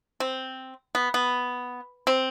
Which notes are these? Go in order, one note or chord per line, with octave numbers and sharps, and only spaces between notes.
C4
B3
B3
C4